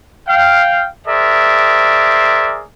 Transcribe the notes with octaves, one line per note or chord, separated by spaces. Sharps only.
F5 G5
G#4 A#4 C5 D5 E5